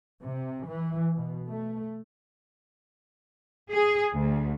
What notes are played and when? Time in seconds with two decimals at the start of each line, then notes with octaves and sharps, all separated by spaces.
0.21 C3
0.68 E3
1.16 B2
1.48 A3
3.72 G#4
4.13 D2